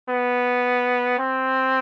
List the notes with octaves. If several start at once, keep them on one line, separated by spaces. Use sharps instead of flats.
B3
C4